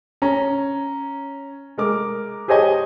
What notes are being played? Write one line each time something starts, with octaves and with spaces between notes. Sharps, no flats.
C#4 A#5
G#3 A#4 D6
G4 G#4 C5 C#5 D#5 G#5